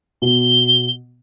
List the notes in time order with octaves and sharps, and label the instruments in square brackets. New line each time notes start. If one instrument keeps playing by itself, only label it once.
[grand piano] B2 [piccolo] G7